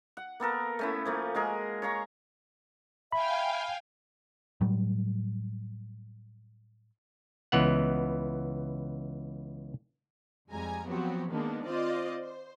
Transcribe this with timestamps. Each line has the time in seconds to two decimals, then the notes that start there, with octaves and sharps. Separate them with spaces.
0.17 F#5
0.40 A#3 B3 A4 A#4
0.79 A3 C#4 E4
1.06 F3 A3 A#3
1.35 G#3 F#4 G#4 A#4
1.82 C#5 F5 A#5 C#6
3.12 E5 F5 G5 G#5 B5
4.61 A2 F#3 G3
7.52 C#2 E3 B3 F#5
10.51 F2 G3 G#3 G#5 A#5
10.87 F3 F#3 B3 C4 F#4 G4
11.30 D#3 G#3 A#3 B3 D4 D#4
11.65 C4 F4 C5 D5 D#5
12.24 C5